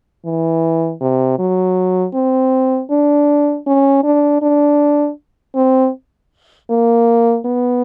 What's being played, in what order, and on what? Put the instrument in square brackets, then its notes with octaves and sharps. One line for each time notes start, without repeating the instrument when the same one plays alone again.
[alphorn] E3
C3
F#3
C4
D4
C#4
D4
D4
C4
A#3
B3